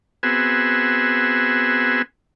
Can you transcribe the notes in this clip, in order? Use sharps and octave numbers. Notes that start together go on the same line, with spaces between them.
B3 C4 F#4 G#4 G#5 E6